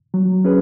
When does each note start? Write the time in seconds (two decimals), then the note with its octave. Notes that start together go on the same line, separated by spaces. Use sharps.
0.14 F#3
0.44 C#4 G#4 B4